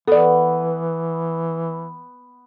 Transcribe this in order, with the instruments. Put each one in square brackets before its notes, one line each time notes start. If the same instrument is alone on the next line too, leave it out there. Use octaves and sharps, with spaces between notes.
[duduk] E3 [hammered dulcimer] B3 [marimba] A4 D5